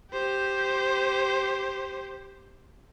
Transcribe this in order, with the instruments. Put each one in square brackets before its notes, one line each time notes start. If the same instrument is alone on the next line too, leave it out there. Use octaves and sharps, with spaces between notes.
[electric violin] G4 C5